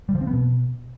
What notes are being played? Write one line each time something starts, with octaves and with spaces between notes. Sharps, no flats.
G3
F3
C4
B3
B2